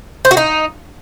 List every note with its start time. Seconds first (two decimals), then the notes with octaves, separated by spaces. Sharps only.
0.25 C5
0.31 F#4
0.37 D#4